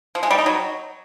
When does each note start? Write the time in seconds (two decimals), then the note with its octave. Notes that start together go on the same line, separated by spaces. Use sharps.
0.15 F3
0.23 G#3
0.31 G3
0.38 D#4
0.46 F#3